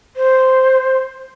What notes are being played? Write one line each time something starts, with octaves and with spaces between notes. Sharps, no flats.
C5